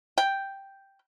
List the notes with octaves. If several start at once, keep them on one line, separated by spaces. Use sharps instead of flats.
G5